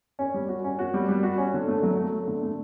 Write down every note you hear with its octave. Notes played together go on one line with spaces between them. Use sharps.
C#4
G3
F#4
C#4
F#4
G3
G3
F#4
C#4
D3
A3
F#3
A3
A3
D3
A3